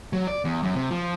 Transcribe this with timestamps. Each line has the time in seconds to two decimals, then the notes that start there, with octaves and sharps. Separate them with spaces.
0.13 F#3
0.27 D5
0.45 E2
0.63 F#2
0.75 C3
0.91 F3